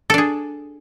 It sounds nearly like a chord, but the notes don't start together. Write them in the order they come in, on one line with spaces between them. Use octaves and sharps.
A4 D4 G#4